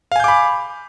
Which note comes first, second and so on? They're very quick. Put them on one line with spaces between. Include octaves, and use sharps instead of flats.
F5 G#5 G6 D6 B5